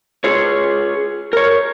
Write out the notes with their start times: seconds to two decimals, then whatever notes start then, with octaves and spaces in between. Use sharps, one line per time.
0.24 F4 G#4 C#5
1.33 A#4 C#5